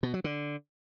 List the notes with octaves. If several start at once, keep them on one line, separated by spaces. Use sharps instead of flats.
B2
F#3
D3